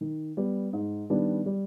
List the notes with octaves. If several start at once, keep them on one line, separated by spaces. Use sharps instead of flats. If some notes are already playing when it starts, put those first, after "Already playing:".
D#3
G3 B3
G#2
D#3 G3 B3 D4
G3